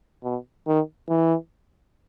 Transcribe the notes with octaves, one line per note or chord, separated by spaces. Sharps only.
B2
D#3
E3